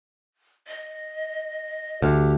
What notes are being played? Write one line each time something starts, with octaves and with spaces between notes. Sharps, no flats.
D#5
D2 G4